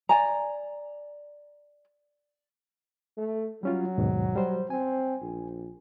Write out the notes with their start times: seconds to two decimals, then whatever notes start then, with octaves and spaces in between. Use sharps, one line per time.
0.09 D5 G#5 A#5
3.18 A3
3.63 F#3 G3 C#4 F4
3.98 D#2 G#2 B2
4.36 G3 C5
4.70 C4 G#5
5.22 A#1